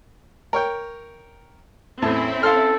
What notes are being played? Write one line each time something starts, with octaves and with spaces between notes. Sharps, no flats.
A#4 C#5 G5
E2 A2 C4 C#4 E4 A5
A4 F5 C6 F6